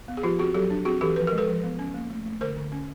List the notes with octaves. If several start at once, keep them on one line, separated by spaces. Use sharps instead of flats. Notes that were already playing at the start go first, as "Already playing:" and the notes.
B3
G#4
F3 F4 G4
C4 F#4 G#4
F#3 G4 A4
D4
C4 F#4 G#4
E3 G4 A4
F3 B4
A#4
G#3
A4 B4
F3
B3
C#4
A#3
A3
A3
D3 A#4 C5
D3
C#4